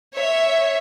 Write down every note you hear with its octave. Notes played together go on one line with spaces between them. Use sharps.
C#5 E5